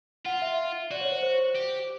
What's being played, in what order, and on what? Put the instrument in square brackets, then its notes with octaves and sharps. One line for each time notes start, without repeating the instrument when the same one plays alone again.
[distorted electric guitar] F4 [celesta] F#5
[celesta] E5
[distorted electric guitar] F#4 [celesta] D5
[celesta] C#5
C5
C5
[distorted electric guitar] G4